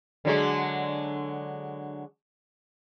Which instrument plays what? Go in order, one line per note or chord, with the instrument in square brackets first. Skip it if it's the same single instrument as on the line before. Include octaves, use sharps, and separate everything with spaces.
[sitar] D3 F#3 G#3